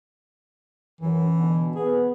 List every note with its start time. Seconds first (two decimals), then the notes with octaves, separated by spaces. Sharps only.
1.01 F#2 E3 F#3
1.35 B2 D3
1.75 B3 G#4